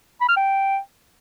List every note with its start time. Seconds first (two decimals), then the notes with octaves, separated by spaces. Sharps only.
0.21 B5
0.29 F6
0.37 G5